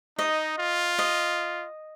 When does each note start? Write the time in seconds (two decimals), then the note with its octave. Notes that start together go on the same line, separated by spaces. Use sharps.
0.18 D#4 D#5
0.58 F4
0.99 D#5